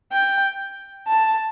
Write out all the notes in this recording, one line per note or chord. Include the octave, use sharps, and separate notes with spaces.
G5
A5